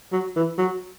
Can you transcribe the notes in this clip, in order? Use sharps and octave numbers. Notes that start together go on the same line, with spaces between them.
F#3
E3
F#3